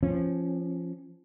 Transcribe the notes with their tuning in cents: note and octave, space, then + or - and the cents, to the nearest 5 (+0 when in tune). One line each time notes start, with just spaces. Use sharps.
F3 -15 C#4 -25